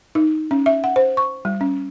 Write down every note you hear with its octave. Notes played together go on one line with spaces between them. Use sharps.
D#4
C#4
E5
F#5
C5
C#6
G3
C#4